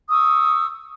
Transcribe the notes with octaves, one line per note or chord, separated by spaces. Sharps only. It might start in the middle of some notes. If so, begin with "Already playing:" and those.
C#6 D#6 E6